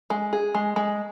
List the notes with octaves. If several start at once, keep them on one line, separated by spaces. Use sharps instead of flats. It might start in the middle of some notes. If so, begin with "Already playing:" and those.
G#3
G#4
G#3
G#3